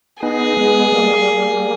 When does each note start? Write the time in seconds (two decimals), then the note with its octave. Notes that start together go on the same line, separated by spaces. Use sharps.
0.22 B3 D#4 G#4
0.57 G#3 B3
0.92 G3 A#3